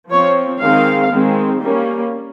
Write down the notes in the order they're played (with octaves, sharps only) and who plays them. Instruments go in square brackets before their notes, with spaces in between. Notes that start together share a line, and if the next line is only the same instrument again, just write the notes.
[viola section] F3 C4 C#5
D#3 G#3 C4 F5
D#3 G#3 C4
G3 A#3 C#4